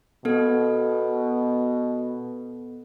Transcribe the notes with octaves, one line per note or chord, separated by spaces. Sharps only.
B2 B3 A4